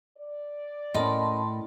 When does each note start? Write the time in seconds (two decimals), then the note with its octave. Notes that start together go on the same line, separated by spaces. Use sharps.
0.17 D5
0.94 A2 C#4 A#4 D#5 A5 B5 C6